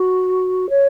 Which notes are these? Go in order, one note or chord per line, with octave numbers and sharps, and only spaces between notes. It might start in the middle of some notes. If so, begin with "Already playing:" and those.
Already playing: F#4
C#5